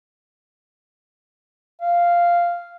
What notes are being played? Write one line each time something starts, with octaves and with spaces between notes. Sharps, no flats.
F5